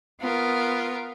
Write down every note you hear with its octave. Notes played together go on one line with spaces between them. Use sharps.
B3 F4 A#4